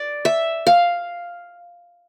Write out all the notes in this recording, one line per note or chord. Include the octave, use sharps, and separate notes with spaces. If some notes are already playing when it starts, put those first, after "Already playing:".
Already playing: D5
E5
F5